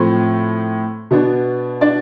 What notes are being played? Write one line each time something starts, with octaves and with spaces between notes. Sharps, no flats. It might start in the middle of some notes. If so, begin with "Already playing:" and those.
Already playing: A2 F3 A3 C4
B2 B3 D4
D4 D5